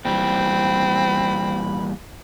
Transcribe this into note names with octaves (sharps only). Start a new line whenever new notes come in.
A#2 E3 G3 C4 B5